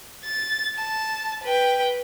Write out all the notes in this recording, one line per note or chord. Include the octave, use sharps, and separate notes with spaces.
A6
A5
B4 G5